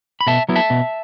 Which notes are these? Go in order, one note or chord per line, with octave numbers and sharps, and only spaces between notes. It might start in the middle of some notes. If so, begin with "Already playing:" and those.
B5
B2 E5 A5
F#3 B3 E4
E5 A5
B2